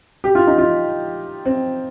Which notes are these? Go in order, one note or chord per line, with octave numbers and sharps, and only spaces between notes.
G4
F4
D#4
F4
C4